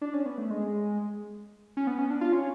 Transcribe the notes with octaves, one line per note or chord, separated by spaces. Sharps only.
D4
C#4
B3
A3
G#3
C#4
B3
C#4
D4
F4
C#4